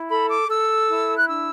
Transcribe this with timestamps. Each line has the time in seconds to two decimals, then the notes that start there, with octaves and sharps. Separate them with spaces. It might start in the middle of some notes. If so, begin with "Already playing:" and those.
Already playing: E4
0.09 A4 B5
0.29 D6
0.49 A4 E6
0.88 E4
1.17 F#6
1.27 D4 E6